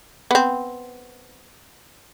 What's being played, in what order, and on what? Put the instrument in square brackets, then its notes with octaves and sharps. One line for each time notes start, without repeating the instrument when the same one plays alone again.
[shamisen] B3 C4